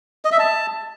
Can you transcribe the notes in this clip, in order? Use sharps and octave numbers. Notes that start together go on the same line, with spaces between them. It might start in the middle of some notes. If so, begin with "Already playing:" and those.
D#5
E5
A5